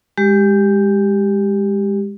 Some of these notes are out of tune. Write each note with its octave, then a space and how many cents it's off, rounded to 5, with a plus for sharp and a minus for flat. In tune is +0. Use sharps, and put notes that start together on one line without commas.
G#3 -25 G4 +0